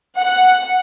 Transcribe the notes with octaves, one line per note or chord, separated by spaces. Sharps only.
F#5